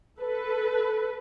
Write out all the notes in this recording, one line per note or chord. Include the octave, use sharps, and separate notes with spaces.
A4 B4